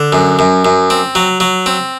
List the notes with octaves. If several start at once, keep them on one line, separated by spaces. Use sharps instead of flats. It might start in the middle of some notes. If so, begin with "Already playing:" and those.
Already playing: D3
F#2
F#2
F#2
C4
F#3
F#3
C4